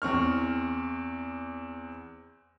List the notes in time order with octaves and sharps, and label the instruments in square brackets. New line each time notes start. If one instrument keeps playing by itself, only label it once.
[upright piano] E2 C4 C#6 F6